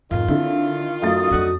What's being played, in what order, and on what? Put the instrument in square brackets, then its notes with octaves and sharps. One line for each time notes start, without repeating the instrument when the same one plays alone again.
[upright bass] F2 G#2 [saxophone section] D#3 F4
[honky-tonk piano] D3 E4 [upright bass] C4
[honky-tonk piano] F#2 A3 A6 [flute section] F#4 D#6
[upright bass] F2 D4 [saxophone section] D3 D#4 F#5